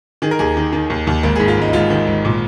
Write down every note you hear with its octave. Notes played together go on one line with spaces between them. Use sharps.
D#3 G#4
A#4
D#2 G#4
D#3
D#3
D#2
D#2
G#1 A#3
G#2 G#4
F4
G#1 D#4
D#4
G#1 F4
D#3
G#1
A#2